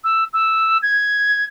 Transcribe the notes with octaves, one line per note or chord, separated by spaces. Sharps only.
E6
E6
G#6